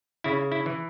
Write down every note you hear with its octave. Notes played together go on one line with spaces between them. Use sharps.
C#3 E4
E4
E3